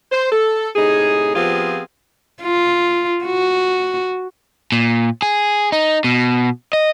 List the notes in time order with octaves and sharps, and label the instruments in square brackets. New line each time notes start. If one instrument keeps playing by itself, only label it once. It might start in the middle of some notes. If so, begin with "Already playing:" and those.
[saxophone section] C5
A4
A2 C3 D#4 G#4
F3 B3 C4 F4 G4 G#4
[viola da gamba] F4
F#4
[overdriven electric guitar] A#2
G#4
D#4
B2
D#5